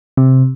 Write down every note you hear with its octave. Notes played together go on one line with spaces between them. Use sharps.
C3